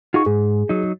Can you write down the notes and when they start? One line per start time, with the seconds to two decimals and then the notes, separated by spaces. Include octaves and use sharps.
0.14 D#4 F4 F#4 G#4 C#6
0.26 G#2 G#4
0.69 F#3 D#4